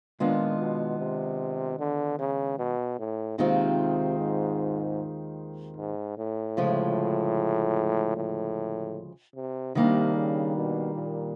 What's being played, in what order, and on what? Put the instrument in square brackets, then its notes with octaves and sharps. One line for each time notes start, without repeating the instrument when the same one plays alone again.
[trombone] A#2 [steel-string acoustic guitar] D#3 G#3 B3 D4 F4
[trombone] B2
C3
D3
C#3
B2
A2
[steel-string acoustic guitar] D#2 D#3 G#3 C4 F4 [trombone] C3
[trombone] G#2
G#2
A2
[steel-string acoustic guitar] D2 C#3 F3 G#3
[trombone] A2
C3
[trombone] C3 [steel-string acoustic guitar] D#3 G3 A#3 D4
[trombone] C#3
B2
A#2